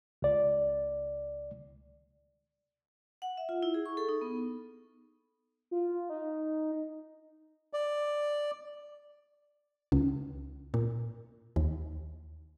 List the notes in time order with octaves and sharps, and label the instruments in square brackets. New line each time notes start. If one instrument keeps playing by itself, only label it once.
[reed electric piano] C#2 D5
[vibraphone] F#5
E5
F4
E4
G#4
C#6
A4
D#4
B3
[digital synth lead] F4
D#4
[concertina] D5
[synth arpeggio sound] C#2
A#2
D#2